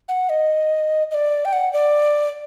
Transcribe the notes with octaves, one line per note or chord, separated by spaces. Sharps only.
F#5
D#5
D#5
D5
G5
F#5
D5